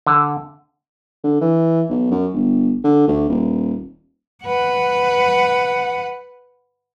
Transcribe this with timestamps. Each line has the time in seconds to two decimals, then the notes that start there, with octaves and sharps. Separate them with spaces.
0.07 D3
1.24 D3
1.41 E3
1.89 B1
2.11 F#2
2.34 G1
2.84 D3
3.07 D2
3.30 D#1
4.44 B4 F#5